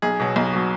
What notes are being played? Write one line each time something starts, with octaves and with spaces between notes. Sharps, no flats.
B1 G#4
B2 F#3
B1
B2 F#3